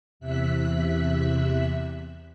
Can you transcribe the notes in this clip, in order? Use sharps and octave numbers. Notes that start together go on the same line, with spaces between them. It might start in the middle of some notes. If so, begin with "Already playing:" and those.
E2 C3 E5 F#6 B6